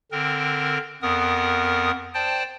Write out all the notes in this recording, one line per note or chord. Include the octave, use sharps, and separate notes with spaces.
D3 C4 A#4
F2 B3 A#4 D#6
C5 D5 G5 A5